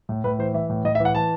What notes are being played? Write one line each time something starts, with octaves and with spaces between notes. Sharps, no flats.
A2
A2 B4
E3 C5
E3 E5
A2
A2 D#5
E5
E3
F#5
E3 A5